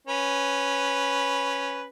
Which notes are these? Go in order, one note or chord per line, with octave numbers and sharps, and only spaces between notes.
C#4 B4